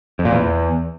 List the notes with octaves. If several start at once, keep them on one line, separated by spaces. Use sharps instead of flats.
F2
A#2
E2